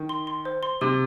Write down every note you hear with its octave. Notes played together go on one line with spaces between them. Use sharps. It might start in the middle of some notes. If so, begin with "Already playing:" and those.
Already playing: D#3
C6
C6
C5
C6
C3 C6